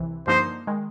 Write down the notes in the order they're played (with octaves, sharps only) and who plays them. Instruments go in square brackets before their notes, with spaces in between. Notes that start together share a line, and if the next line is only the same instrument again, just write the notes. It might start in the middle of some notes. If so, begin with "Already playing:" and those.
Already playing: [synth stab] C2 C3 E3
[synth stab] G2 D3 F3 A#3 D#4 [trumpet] C5
[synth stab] D#3 G#3